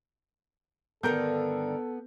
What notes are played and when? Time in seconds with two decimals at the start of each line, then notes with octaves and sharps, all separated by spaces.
1.03 G2 D3 D#3 B3 A4 A#4 G6